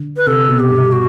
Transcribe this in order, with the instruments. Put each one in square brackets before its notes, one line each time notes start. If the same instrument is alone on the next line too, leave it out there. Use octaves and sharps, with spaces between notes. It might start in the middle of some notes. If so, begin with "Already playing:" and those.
Already playing: [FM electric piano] D3
[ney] B4
[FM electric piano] C3 [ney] A4
[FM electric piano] B2
[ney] G4
[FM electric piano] G2
[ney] F#4